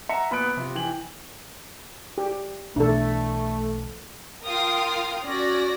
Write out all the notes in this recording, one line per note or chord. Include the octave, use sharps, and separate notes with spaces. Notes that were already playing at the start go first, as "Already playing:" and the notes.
E5 F#5 A#5 C#7
A#2 B3 B5 D#6 F#6 D7
C3 F4
E3 G5 G#5 F#7
G4
B1 B2 E3 A3 D4 A4
F4 A#4 F5 G5 D#6
C#4 F#4 D5 A#6